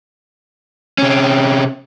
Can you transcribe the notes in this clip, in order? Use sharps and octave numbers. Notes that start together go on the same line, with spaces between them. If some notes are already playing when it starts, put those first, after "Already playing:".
C3 C#4